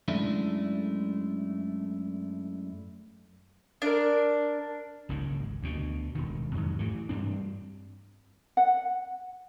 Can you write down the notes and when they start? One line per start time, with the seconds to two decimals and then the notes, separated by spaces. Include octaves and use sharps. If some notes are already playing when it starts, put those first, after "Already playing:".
0.08 F#2 G#3 A3 D4 E4
3.82 D4 A#4
5.09 F#1 C#2 G#2 D#3
5.63 D2 B2
6.15 E1 D#3
6.55 F2 G#2 F#3
6.79 E3 A3
7.09 G2 G3 C4 D4
8.57 F#5